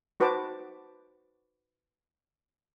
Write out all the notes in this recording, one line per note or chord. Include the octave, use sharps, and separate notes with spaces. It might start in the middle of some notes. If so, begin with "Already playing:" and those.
D#4 F#4 B4 C5 A5 D6